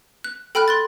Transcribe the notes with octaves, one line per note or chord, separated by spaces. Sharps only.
F#6
A4 G5 B5 F6 F#6
C6 F#6 A6